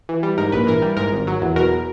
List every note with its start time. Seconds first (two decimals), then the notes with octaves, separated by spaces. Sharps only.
0.09 E3
0.23 G3
0.38 G#2 A#4
0.52 A#1 B4
0.67 E3 A#4
0.82 G3
0.97 G#2 A#4
1.12 G#1
1.27 F#3
1.41 E2
1.56 B2 A#4